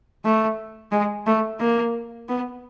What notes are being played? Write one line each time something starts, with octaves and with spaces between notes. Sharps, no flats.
A3
G#3
A3
A#3
B3